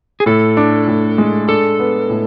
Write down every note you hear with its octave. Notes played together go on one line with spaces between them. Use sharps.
G#4
A2 A4
D4
A2
G#3
D4 A4
B3
A2